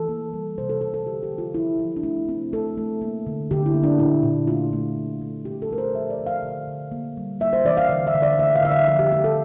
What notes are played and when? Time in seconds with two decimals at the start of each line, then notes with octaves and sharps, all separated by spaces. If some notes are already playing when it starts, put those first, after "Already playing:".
Already playing: E3 A4
0.09 A#3
0.34 G3
0.58 C3 C5
0.69 A4
0.81 C3 A4
0.94 A4
1.06 D3 G4
1.23 G4
1.31 F3
1.38 F4
1.54 F3 E4
1.79 F3
1.96 D4
2.03 A3 E4
2.29 A3 C4
2.53 A3 A4
2.77 A3
3.02 A#3
3.27 D3
3.51 D3 G4
3.66 E4
3.74 A#3
3.84 D4
3.99 A#2 E4
4.23 A#2
4.47 A3 F4
4.73 A3
4.97 A#2
5.21 A3
5.45 A#2 G4
5.62 A4
5.71 A3 A#4
5.78 C5
5.95 F3 E5
6.10 D5
6.19 F3
6.26 F5
6.43 D3
6.67 D3
6.92 A#3
7.17 G3
7.40 A#3 E5
7.53 C5
7.65 E3 D5
7.77 F5
7.90 D3
8.07 E5
8.15 D3
8.22 D5
8.39 A3 E5
8.56 F5
8.62 D3 E5
8.71 F5
8.88 F3 E5
8.99 G4
9.11 A3 G4
9.24 A4